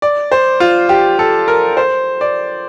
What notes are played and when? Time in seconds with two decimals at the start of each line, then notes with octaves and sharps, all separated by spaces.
0.02 D5
0.32 C5
0.60 F4
0.89 G4
1.19 A4
1.48 A#4
1.77 C5
2.21 D5